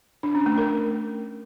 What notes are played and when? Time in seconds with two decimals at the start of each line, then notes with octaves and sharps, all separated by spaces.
0.23 D4
0.35 C#4
0.46 A3
0.58 A#4